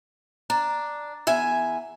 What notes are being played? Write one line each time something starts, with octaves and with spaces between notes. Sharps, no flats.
D4 A#5
E2 E5 G#5